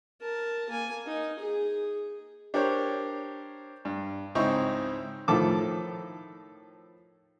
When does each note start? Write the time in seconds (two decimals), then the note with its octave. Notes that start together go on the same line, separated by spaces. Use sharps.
0.22 A#4 A5
0.70 A#3 G#5
1.06 D#4
1.39 G#4
2.54 D4 G4 A#4 C5 C#5
3.85 G2
4.35 C#2 G#2 C4 D#4 E4 C#6
5.28 A2 D#3 F3 A4 A5 D6